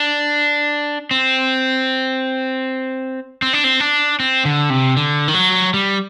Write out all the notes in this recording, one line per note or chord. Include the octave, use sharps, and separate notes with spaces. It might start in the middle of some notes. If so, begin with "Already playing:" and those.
Already playing: D4
C4
C4
D4
C4
D4
C4
D3
C3
D3
D#3
F#3
G3